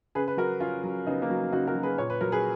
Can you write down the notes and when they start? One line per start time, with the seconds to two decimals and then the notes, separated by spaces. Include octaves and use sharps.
0.15 C#3 G#4 B4
0.28 B4
0.37 F#3 F#4 A#4
0.60 C#3 C#4 F4
0.84 F#3
1.07 C#3 B3 D#4
1.22 A#3 C#4
1.30 F#3
1.52 C#3 D#4 F#4
1.67 F#4 A#4
1.75 F#3
1.83 G#4 B4
1.98 A#2 C#5
2.10 B4
2.21 F#3 A#4
2.32 G#4 B4